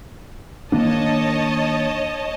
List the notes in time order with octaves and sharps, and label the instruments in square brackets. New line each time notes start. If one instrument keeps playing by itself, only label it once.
[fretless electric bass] D#3 A#3 D4 [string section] C#5 D#5 A5